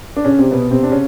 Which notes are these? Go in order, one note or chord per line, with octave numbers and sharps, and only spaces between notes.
D4
C#3 C#4
C3 C4
B2 B3
C3 C4
D4
C#3 C#4